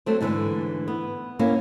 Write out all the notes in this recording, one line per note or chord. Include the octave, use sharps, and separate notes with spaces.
F#3 A3 C4
G#2 D3 E3 G3 A3
B3
A#3 C#4 E4 F5